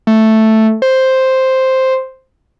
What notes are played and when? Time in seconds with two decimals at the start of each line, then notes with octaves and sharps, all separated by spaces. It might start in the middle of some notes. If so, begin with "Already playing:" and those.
0.07 A3
0.82 C5